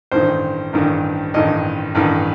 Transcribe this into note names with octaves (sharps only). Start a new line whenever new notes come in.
A1 G2 D#3 C5
A1 G2 D#3
A1 G2 D#3 D#5
A1 G2 D#3